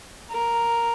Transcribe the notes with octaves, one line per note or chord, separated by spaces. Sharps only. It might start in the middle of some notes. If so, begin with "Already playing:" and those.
A#4